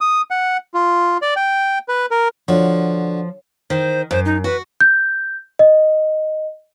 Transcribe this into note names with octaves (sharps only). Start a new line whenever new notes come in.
D#6
F#5
F4
D5
G5
B4
A#4
D3 F3 F#4 C#5
D#3 C5
F#2 C5
D#4
F#4 B4
G6
D#5